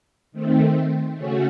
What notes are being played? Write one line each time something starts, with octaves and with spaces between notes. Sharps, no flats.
D#3 A3 C4
C#3 A3 C#4 F#4